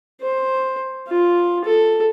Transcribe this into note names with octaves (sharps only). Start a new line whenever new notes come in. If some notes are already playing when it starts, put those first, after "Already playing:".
C5
F4
A4